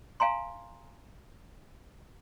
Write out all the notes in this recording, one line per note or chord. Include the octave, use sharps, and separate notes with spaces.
F5 G#5 A#5 C6